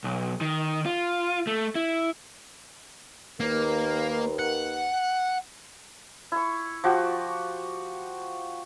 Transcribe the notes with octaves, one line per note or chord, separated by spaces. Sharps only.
B1
D#3
F4
A3
E4
D#2 A#3 A#4 B4
F#5
E4 C#6
F3 F#4 G4